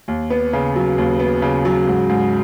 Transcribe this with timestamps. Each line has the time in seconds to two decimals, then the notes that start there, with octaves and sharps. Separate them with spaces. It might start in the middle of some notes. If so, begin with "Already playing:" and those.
0.08 D#2
0.30 B3
0.53 C#3
0.76 F#3
0.98 D#2
1.19 B3
1.42 C#3
1.65 F#3
1.87 G#2
2.10 G#2